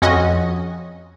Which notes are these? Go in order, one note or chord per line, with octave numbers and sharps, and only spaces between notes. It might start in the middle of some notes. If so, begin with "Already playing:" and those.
F2 C#4 F#4 D#5